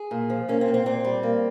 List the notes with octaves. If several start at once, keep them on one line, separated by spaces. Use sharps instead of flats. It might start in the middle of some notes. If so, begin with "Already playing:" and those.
Already playing: G#4
A#2
F3
A#3 C#4
C4
A#2
C4
A#2 C4
G3
A#3